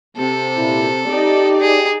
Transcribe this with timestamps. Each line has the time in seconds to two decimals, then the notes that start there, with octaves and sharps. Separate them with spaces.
0.17 C3 A4
0.57 A#2 E4
1.08 D#4 G4 D5
1.60 G#4